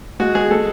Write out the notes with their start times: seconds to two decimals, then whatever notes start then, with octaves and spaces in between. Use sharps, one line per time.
0.20 G#3 F#4
0.35 G#3 G#4
0.51 G#3 A4